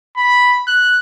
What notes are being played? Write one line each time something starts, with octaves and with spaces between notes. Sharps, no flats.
B5
F#6